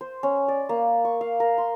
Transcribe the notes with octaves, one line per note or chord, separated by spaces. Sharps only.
C5
C#4
D5
A#3
C#6
F5
A#4
C6